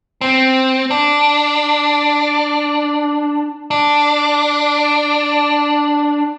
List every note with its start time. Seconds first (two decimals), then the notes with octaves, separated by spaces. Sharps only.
0.21 C4
0.91 D4
3.71 D4